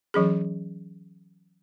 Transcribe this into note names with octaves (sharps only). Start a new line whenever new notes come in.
E3 F#3 C#4 G#4